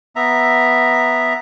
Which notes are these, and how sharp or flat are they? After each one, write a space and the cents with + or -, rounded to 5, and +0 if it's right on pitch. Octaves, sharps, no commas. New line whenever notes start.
B3 +0 E5 +0 A#5 +0